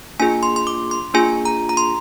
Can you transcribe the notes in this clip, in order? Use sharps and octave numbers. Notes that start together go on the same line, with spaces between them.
A#3 D4 F4 G#4 G#5
C6
C6
D6
C6
A#3 D4 F4 G#4 G#5
A#5
A#5
C6